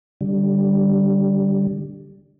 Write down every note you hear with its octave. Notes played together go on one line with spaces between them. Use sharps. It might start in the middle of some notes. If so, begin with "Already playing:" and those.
D3 G3